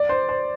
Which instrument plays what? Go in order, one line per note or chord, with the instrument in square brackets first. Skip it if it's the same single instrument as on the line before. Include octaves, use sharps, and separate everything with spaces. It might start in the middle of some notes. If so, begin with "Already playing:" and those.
Already playing: [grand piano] D5
C5
C5